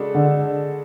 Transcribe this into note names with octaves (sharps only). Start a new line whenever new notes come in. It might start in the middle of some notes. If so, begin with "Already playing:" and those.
Already playing: C#3 G#3 D4 F#4 A4
D3